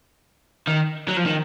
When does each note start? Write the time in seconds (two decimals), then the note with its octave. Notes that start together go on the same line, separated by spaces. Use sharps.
0.67 D#3
1.08 F#3
1.17 F3
1.26 D#3